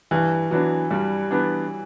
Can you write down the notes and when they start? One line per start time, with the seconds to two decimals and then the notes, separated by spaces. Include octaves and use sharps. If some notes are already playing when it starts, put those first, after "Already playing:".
0.11 G2 E3
0.51 E3 F#3 B3 D4
0.91 G2 G3
1.31 E3 B3 D4